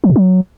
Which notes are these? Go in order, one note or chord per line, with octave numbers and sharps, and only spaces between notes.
F3
A#2
F#3